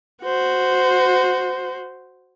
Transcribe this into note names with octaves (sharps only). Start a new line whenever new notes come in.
F#4 C5